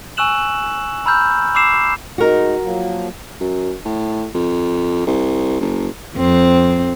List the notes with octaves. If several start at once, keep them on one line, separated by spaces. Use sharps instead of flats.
G#5 C#6 E6 F#6 E7 F#7
A#5 B5 E6 F6 G6
B5 D6 E6 C7 E7
G#3 D#4 F#4 A#4
F3 F#3 A#3
F#2
A2
F2
C2
F#1
F2 C4